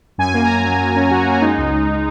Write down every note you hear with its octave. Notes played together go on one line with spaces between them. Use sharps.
F#2 G#5
A#3
A#5
A#3 G#5
F#3
F#2
C#4
F#2 F#4
A#3
G#3 D#4
C#2
C#2